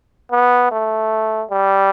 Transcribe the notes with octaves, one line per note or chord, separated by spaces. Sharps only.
B3
A3
G3